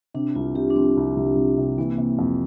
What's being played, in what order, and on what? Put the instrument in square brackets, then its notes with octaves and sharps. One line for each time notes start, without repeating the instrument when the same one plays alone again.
[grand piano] C3 [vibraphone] D4
[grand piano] C2 [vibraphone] F4
[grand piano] C3 [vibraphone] G4
[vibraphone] D4
[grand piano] F3 [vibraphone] C4
[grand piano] C2
C2
C2
C3
[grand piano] E3 [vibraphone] A#3
[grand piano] C3
F2